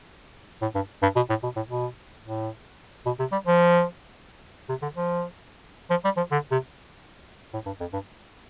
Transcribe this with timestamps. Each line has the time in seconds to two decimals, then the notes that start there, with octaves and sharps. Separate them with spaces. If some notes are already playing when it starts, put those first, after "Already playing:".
0.62 A2
0.75 G2
1.02 G2
1.16 B2
1.30 A2
1.43 B2
1.56 A2
1.70 B2
2.24 A2
3.06 B2
3.19 C3
3.32 G3
3.47 F3
4.69 C3
4.82 D3
4.95 F3
5.90 F3
6.04 G3
6.17 F3
6.32 D3
6.51 C3
7.53 A2
7.66 G2
7.80 F2
7.93 G2